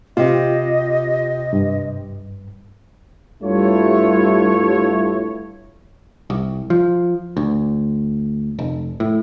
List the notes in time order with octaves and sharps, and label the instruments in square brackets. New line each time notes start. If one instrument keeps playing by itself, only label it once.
[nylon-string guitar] C3 [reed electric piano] F4 G4 [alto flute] D#5
[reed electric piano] G2
[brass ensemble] G2 G3 A3 E4 F4 C#5
[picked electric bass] C2
F3
D2
F1
A2